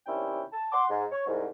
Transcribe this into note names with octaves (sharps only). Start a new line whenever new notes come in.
D#2 C3 C#4 D4 E4 G5
A5
F#5 C6 D6
G#2
C#5
C2 G#2